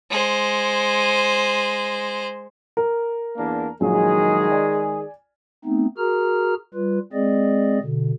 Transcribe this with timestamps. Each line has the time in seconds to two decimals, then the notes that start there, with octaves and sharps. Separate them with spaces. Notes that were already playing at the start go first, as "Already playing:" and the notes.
0.10 G#3 C5
2.77 A#4
3.37 E2 A#3 D4
3.81 A#1 D#3 F#3 G#3 G#4
4.52 D5 G#5
5.65 A3 B3 C4 D#4
5.98 F#4 G#4 A#4 A#5 F6
6.74 G3 F4 B4
7.13 G#3 C4 G#4 D5 D#5
7.82 B2 D3